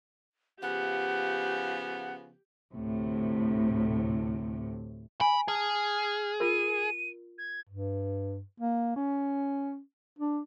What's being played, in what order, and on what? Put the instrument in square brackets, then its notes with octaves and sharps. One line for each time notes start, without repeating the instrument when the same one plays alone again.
[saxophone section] C#3 F3 B3 [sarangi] G4 [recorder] F#5
[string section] D2 A2 C3
[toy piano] G#5 [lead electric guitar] B5
[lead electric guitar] G#4 [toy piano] A5 [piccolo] F6
[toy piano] F4 A#4 [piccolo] D#7
[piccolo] G#6
[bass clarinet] G2
A#3
C#4
D4